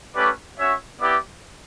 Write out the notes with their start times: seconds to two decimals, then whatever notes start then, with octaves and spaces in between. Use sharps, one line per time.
0.15 A3 C#4 G4 B4 D5
0.58 C#4 F#4 C#5 E5
1.01 B3 E4 G4 B4 D5